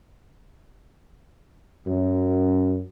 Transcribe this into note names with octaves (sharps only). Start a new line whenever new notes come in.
F#2